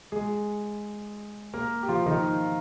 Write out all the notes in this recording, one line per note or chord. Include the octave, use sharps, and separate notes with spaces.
G#3 G#4
A#3 A#4
G4
F3 F4
D#3 D#4